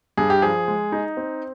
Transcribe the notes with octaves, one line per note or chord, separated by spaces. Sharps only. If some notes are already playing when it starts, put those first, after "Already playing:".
G2 G#4
G4
F3 G#4
G#3
D#4
C4